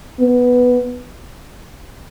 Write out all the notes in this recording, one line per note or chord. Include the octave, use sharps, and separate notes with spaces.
B3